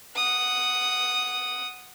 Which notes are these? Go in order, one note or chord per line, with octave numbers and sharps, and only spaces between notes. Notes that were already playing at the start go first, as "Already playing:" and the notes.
F#5 D#6